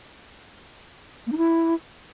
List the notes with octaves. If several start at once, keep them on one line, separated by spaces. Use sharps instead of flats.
A#3
D#4
E4